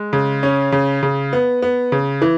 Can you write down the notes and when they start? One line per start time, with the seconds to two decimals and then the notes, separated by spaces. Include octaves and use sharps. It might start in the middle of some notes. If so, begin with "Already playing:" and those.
Already playing: G#3
0.13 C#3
0.43 C#4
0.72 C#3
1.03 C#3
1.33 B3
1.62 B3
1.92 C#3
2.22 E3